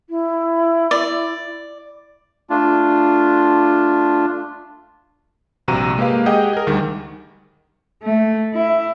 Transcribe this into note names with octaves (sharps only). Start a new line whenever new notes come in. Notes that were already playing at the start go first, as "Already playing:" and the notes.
E4
D5
A3 D4 F4
A#1 G2 C3 F#4 A#5 D#7
G#3 A#3 G4 B4 F5
G4 G#4 D#5 F#5 G5
G#4 A#4
D2 D#3 G3
A3
E4